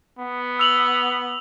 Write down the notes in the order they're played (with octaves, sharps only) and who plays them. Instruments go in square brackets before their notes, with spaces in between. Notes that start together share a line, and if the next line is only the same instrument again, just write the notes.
[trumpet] B3
[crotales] E6 F7 F#7